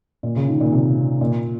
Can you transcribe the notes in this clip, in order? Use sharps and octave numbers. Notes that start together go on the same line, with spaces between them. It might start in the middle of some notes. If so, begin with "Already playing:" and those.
A#2
C#3
D#3
A#2
C3
A#2